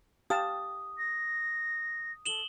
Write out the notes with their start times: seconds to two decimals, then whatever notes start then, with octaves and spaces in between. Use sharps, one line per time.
0.30 G4 F5 A5 D#6
0.97 A#6
2.26 A4 E7 F#7 G7